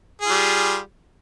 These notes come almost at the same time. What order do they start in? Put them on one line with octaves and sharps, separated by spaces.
G#4 F4 G3